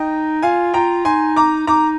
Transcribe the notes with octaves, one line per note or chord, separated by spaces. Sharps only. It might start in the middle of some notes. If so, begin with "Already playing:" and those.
Already playing: D#4 D#5 G5
F4 F5 G#5
F4 G5 A#5
D#4 G#5 C6
A#5 D6
D#4 A#5 D6